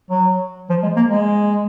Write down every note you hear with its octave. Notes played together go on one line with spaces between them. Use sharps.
F#3
F3
G#3
A#3
G#3